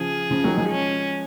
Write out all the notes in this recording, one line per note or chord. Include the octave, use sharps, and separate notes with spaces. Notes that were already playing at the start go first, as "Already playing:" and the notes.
Already playing: C#3 F3 G#4
C#3 F3
D#3 F#3
F3 G#3
C#4